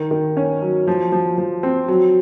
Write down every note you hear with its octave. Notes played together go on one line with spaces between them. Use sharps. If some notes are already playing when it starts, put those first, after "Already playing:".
Already playing: D#3
D#3
C#4
F#3
F3
F3
F3
C4
F#3